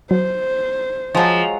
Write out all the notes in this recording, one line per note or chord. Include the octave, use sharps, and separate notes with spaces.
F#3 C5
F3 F#3 G#3